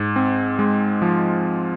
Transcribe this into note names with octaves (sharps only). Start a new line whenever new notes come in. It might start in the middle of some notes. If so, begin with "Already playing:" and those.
Already playing: G#2
C4
G#3
F3